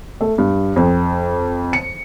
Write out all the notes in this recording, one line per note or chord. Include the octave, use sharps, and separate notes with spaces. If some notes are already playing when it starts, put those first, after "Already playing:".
A3
G2
F2
C#7